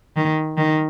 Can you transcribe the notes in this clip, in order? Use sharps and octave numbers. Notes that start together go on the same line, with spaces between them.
D#3
D#3